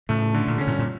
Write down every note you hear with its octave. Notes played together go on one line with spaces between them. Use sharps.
A2 C#3 A3
D3
A#2
C#3 C#4
G2 A#2
A#2